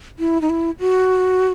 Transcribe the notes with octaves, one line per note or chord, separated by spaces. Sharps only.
E4
D#4
E4
F#4